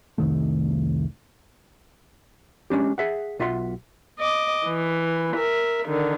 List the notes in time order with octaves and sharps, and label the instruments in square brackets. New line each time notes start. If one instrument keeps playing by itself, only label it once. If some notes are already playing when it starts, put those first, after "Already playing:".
[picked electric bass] F1 C2 D#3 A3
[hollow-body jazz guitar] G#3 C#4 D4 G4
G#4 E5 F#5
B1 F4 E5 F#5 C6
[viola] D#5 D6
E3
A#4 E5
D3 D#3